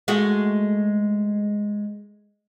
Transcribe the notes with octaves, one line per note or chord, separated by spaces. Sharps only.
G#3 A3 F#4